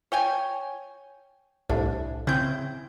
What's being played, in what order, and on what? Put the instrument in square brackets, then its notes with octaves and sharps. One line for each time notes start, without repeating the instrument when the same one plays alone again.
[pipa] C#5 G5 G#5
[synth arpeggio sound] C2 A2 [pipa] D4
[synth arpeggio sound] C#3 C4 G6 [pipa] E4